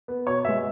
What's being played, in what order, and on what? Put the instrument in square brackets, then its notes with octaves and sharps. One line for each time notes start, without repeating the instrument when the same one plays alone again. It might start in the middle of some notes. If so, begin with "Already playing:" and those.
[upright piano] B3
B2 C#5
G#3 B3 E5